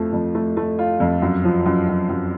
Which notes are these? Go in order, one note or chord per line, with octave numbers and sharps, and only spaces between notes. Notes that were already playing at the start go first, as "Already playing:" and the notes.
Already playing: F2 F3 A3
F2
A3
A3
F4
F2
F#2
F3
F#2
F#2
F#2